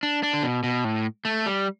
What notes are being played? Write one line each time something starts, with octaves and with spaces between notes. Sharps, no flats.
D4
D4
D3
B2
B2
A2
A3
G3